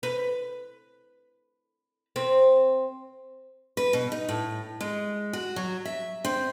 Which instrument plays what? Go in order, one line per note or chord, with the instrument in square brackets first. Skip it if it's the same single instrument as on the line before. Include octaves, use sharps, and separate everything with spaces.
[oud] B4
C4
[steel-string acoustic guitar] B4
B2
D#4
A2
G#3
F#4
F#3
E5
C4